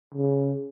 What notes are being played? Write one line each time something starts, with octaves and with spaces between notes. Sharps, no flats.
C#3